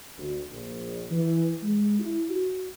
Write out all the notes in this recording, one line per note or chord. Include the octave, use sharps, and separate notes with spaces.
D2
A#1
E3
G#3
E4
F#4